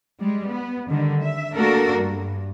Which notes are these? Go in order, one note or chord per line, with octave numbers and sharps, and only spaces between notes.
G3 G#3
B3
D3 D#3 G3
E5
A3 A#3 D4 F#4 A4 A#4
G2